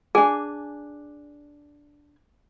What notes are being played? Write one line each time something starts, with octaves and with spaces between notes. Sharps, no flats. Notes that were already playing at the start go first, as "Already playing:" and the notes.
D4 G#4 G#5